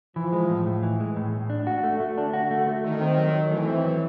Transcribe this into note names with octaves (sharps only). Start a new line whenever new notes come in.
E3 F3
G#3
A2
A2
E3
G#3
A2
A2
D4
F#4
A3
A3
D3 D4
F#4
A3
A3
D#3 A3
C4
F#3
F#3
E3 A3
C4
F#3